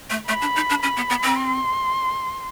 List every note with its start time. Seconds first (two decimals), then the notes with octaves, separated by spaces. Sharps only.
0.10 A3
0.28 A3 B5
0.41 D4
0.56 D#4
0.69 D4
0.82 C#4 B5
0.96 B3
1.10 B3
1.23 C4
1.36 C6